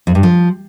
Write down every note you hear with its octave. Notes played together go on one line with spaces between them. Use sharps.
F2
G2
F3